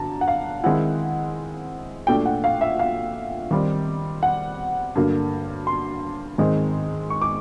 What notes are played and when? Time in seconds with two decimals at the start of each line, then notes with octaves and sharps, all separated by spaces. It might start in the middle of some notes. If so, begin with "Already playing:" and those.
Already playing: G2 D3 F#3 A5 A#5
0.21 F#5
0.28 F5
0.64 D#3 G#3 C4 E4 F#5
2.07 A#2 F#3 A3 D4 G5
2.26 F#5
2.44 F5
2.61 E5
2.79 F5
3.51 D#3 G3 C4
4.23 F#5
4.95 G2 D3 F#3 A#3
5.67 C6
6.38 G#2 D#3 G#3 C4 D#4
7.10 C#6
7.22 D6